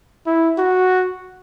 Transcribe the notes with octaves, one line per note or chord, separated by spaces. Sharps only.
E4
F#4